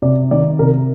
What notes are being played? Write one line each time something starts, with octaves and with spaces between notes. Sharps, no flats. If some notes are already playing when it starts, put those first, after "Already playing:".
C3 D5
D#3 D5
C3 A#4